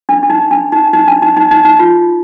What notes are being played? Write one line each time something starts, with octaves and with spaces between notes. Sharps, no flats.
D4
D4
D#4
D4
D#4
D#4
D4
D#4
D#4
D#4
D#4
F4